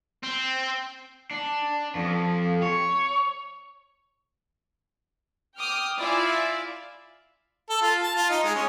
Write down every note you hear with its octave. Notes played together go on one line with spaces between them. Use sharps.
C4
D4
F2
C#5
G5 D6 D#6 F6
E4 F4 D5 E5 F5 G#5
A4
F4
A5
F4
D#4
G#3
C#4